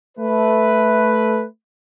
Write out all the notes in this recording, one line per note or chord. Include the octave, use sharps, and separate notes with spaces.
A3 B4